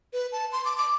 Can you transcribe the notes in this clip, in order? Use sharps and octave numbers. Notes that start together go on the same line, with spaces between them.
B4
A5
C6
D6
D6